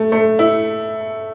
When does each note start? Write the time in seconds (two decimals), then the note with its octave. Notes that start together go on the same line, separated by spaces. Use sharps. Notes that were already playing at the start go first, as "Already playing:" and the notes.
Already playing: A3
0.12 A3
0.39 E4